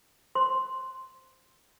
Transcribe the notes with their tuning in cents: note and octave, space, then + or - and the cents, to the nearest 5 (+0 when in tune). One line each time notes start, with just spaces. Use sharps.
C5 +0 C6 +0